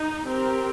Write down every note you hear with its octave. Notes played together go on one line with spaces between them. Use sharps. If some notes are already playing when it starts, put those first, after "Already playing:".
Already playing: D#4
C4 G4 A#4